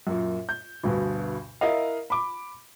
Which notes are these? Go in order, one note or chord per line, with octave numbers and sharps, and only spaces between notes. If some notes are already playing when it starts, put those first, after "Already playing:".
F#2 A#2
G6
D2 G2 B2
E4 A#4 D#5 F5
B5 D6